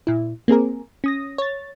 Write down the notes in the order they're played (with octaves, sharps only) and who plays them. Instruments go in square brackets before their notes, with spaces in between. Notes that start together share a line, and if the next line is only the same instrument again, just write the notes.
[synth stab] A#2 E4
A#3 C4 G#4 A#4
C#4 D#6 A#6
C#5 A6